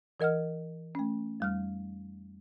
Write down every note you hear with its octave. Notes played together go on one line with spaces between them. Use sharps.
E3 A#4 D#5 F#5 F6
A3 C#4
F2 G3 F6